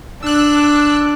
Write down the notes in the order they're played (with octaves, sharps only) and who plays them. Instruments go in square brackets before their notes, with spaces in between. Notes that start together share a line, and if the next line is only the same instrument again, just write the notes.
[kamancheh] D4 [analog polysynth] E6 F#6